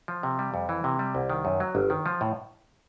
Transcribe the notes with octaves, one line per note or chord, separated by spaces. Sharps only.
F3
C3
G3
F2
E3
C3
G3
C2
D#3
F#2
F#3
G1
D#3
F3
A2